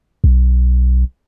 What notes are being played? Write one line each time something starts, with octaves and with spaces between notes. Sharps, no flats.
B1